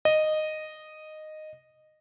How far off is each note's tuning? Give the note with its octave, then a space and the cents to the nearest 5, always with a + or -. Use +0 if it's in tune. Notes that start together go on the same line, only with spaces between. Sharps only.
D#5 -10